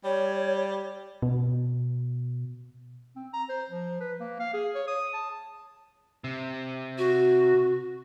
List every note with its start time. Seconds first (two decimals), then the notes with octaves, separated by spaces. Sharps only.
0.05 G3 C#5
1.22 B2
3.16 C4
3.33 A#5
3.49 C5
3.70 F3
4.00 B4
4.20 A#3
4.40 F5
4.54 G#4
4.75 C#5
4.88 D#6
5.14 A5
6.24 C3
6.98 F#4